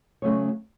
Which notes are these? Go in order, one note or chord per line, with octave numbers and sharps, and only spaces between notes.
C#3 F#3 A3 C#4 C#5